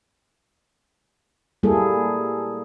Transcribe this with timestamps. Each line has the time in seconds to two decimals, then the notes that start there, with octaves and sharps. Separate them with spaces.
1.63 G3 A#3 E4 G#4 A4